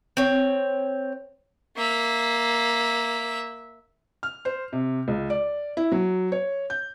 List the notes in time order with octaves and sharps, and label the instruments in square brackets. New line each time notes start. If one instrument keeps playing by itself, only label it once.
[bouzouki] C4 C#5
[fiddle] A#3 E5
[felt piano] F6
C5
C3
C#2
D5
E4
F#3
C#5
G6